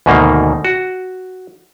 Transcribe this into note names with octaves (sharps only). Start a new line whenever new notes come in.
D2 G#2 B2 D#3 A#3
F#4